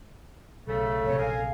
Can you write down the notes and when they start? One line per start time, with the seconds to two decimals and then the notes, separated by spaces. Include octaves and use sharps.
0.67 B1 C#3 A3 A4
1.04 A#1 F#2 C3 C#5
1.19 G#4 A#4 F5 G#5